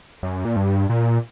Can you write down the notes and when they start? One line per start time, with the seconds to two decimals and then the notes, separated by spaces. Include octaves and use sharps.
0.23 F#2
0.45 A#2
0.56 G2
0.90 A#2